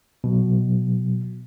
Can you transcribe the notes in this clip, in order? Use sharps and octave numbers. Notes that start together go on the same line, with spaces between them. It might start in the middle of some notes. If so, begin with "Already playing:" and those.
B2 F#3